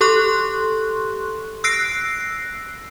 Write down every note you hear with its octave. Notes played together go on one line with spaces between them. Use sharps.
G4 A4 C6 C#6 F#6
E6 F#6 A#6 C7 D7